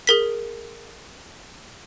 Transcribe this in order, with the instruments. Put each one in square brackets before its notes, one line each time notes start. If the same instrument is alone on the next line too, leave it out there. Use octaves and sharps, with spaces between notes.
[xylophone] G#4 A#4 B6